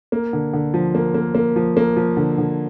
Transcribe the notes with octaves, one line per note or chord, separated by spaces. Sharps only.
A#3
D3
D3
F3
A#3
A#3
A#3
F3
A#3
F3
D3
D3